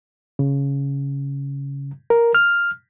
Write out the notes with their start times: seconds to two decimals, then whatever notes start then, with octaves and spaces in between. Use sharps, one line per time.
0.39 C#3
2.10 A#4
2.35 F6